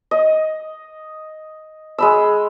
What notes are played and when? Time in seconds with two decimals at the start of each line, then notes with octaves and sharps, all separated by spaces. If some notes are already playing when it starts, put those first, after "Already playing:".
0.11 D#5
1.98 G#3 B5 E6